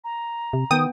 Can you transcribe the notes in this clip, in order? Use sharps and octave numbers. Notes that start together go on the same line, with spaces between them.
A#5
C3
D#3 B3 G5 D#6